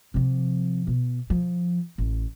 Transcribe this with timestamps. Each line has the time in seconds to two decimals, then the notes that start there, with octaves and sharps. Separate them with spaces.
0.14 C3 F3
0.87 B2
1.30 F3
1.98 A1